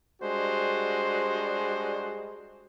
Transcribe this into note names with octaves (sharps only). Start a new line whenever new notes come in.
G3 G#3 D4 F#4 C5